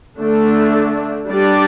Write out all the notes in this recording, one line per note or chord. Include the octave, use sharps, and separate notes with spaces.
D3 A3 D4
G3 D4 G4 D5